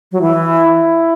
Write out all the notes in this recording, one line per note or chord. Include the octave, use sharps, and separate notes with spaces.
F#3
E3 E4